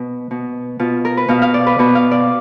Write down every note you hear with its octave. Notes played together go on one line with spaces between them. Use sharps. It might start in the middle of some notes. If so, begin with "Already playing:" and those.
Already playing: B2
B2
B2 F4
A#4
B4
B2 F5
F5
D5
B4
B2 B4
F5
D5